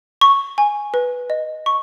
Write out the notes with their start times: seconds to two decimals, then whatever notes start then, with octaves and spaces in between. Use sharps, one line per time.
0.21 C#6
0.58 G#5
0.94 B4
1.30 D#5
1.66 C#6